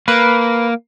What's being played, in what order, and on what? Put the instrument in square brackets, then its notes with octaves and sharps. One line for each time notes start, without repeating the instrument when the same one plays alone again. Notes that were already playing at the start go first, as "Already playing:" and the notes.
[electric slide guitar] A#3 [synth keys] B4